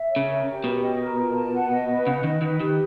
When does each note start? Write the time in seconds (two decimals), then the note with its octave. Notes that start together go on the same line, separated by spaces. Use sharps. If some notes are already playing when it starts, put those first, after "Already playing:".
Already playing: E5
0.11 C#5
0.16 C#3
0.29 A#4
0.47 G4
0.64 B2 G5
0.82 D#5
1.00 A#4
1.17 F4
1.35 A5
1.53 F#5
1.71 D#5
1.89 B4
2.06 C#3 F#5
2.24 D#3 D#5
2.41 D#3 B4
2.60 D#3 G4